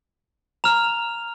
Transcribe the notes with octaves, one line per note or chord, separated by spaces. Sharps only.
A#5 F6 F7